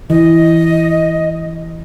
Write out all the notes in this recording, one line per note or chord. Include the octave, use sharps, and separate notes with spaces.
E3 D#5